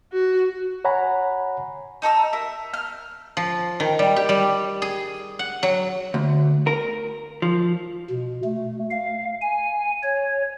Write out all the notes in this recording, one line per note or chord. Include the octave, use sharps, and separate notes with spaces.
F#4
C#5 F#5 G#5 A#5 B5
D#4 A4 A#5 E6
A#4 E5
F6
F3
D#3
G3
G4
G3
G#4
F#5
F#3
D2
A#4
F3
B2
A3
F5
G#5
C#5